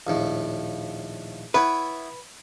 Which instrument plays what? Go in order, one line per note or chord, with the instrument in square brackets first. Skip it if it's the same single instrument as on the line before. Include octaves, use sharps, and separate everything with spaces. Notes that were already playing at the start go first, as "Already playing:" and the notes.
[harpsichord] A#1 D#2 A2
[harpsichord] B3 E4 C#5 [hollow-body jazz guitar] B4